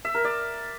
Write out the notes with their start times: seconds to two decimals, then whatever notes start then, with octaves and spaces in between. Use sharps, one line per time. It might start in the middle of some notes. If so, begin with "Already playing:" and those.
0.05 E5
0.15 A#4
0.24 D5